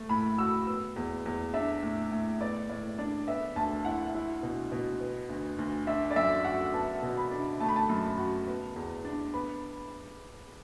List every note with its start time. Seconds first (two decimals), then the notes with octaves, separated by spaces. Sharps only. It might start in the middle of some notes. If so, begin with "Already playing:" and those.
Already playing: A3
0.09 A2 B5
0.38 F#4 E6
0.67 B3 E6
0.96 E2
1.26 E2
1.54 D4 E5
1.83 A2
2.12 A2
2.41 B3 D5
2.70 A2 D5
2.98 D4 D5
3.27 B3 E5
3.56 D2 A5
3.85 E4 F#5
4.14 E4
4.43 B2
4.72 B2
5.01 B3
5.29 D2
5.59 D2
5.87 D4 E5
6.11 D5
6.16 F#2 E5
6.44 F#4 F#5
6.74 B3 A5
7.03 B2
7.17 B5
7.31 D4
7.60 A3 A5
7.69 B5
7.76 A5
7.89 F#2
8.18 F#4
8.48 B3
8.76 E2
9.05 D4
9.34 B3 B5